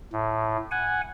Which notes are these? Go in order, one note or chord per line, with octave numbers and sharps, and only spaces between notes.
A2
F#5 G#5